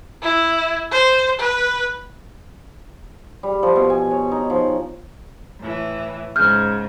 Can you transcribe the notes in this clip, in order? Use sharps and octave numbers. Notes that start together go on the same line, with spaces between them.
E4
C5
B4
G3
F3
B2
G#5
C#5
D#4
F3
A2 E3
G#2 C#3 F6 G6